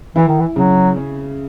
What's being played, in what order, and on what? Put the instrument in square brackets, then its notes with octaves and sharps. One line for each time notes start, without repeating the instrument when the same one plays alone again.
[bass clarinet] E3 [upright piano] E4
[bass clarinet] D#3
E3
[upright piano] C#3 [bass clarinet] F#3
[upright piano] C#4